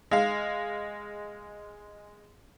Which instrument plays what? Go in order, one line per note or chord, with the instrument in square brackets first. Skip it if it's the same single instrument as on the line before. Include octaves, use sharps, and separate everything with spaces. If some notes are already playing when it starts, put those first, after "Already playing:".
[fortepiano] G#3 F5